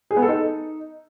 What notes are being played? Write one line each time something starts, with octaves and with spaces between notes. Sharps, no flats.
G#4
B3
A4
D#4